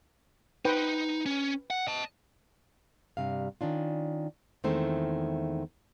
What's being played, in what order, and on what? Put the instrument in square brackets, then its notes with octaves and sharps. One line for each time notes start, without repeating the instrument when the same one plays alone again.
[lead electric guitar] D#4 [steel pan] B4 C5 G5
[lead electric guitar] C#4
F#5
D#5 A5
[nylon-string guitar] G2 C3 F5
D#3 C#4 D4 F4
E2 D#3 G#3 A3 C4 C5